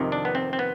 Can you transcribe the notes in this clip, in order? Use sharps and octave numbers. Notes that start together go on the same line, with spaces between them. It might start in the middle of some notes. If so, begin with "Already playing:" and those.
Already playing: F2 C3 D#3
D4
B3
C4
C4
B3